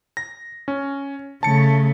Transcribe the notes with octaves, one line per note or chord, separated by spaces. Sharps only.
A#6
C#4
C#3 A3 A5 C#7